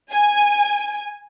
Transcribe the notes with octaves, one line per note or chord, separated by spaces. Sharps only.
G#5